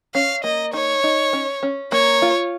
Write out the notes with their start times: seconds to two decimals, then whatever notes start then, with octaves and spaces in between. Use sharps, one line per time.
0.14 C#4 F5
0.44 A#3 D#5
0.73 D#4 C#5
1.03 D#4
1.33 C#4
1.63 C#4
1.92 A#3 C#5
2.22 F4